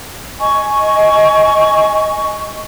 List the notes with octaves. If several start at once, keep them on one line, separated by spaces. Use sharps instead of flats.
D#5 G#5 C#6